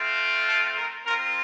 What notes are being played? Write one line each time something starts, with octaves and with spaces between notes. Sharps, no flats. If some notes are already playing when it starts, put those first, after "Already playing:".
Already playing: A3 C4 F4
A4
A#4
C4 F4 A#4